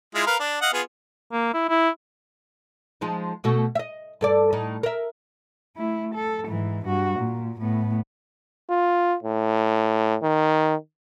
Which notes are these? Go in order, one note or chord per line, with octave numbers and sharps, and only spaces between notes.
G#3 E4 F4
A#4 B4 F5
D4
D#5 F5 F#5
B3 F4 G#4
A#3
E4
E4
F3 G#3 D#4
B2 A3 F#4
D#5 E5
G2 A4 D5
A2 D#4
A#4 E5
A3 E4
A4
G#2 E3
G2 F#4
A#2
A2 B3
F4
A2
D#3